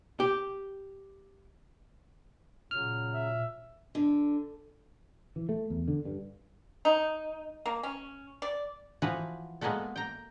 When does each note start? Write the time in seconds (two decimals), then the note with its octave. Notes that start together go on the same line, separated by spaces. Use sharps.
0.20 G4
2.71 A#2 C#3 F#3 F6
3.14 E5
3.95 D3
5.36 E3
5.49 A3
5.70 E2
5.88 D3
6.05 G2
6.85 D#4
7.66 A#3
7.83 C#4
8.42 D5
9.02 E3 F3 F#4 B4
9.61 G#3 A#3 B3 F#4 A4
9.96 G5 A#5